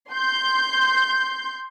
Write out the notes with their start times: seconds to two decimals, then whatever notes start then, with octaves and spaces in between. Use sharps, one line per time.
0.10 C6 G6